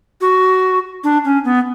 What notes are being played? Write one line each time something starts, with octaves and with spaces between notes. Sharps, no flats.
F#4
D4
C#4
B3